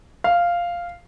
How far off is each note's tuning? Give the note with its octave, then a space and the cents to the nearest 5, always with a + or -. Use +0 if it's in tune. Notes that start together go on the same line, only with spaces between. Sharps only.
F5 -5